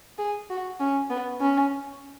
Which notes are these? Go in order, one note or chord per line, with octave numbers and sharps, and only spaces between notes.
G#4
F#4
C#4
B3
C#4